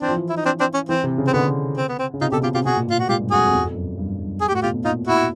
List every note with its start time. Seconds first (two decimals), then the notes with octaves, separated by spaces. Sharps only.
0.01 E3 C4 D4
0.09 F3
0.16 E3
0.30 E4
0.37 D#4
0.45 C4 D4
0.60 C4 D4
0.74 C#4
0.89 E3 C4
1.04 C3
1.18 C#3
1.27 C4
1.33 D3 B3
1.77 C4
1.89 B3
1.99 C4
2.14 C#3
2.21 C3 D#4 F4
2.32 B2 G4 A4
2.43 B2 F4 G4
2.54 C3 F4 G4
2.65 B2 F#4 G#4
2.76 A#2
2.88 A#2
2.91 F4
2.98 A#2 F#4
3.09 G#2 F4 G4
3.20 G2
3.31 F2 F#4 G#4
3.43 F2
3.53 E2
3.64 F2
3.75 F#2
3.98 G2
4.20 G2
4.41 G#4
4.48 G4
4.52 A2
4.55 F#4
4.62 B2 F4 G4
4.74 B2
4.85 A#2 D#4 F4
5.07 E4 F#4